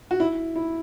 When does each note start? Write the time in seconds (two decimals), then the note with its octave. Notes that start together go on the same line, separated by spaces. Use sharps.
0.11 F#4
0.20 E4
0.56 E4